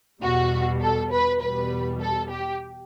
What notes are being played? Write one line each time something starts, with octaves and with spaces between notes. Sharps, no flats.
E2 B2 G3 F#4
A4
B4
E2 B2 G3 B4
A4
G4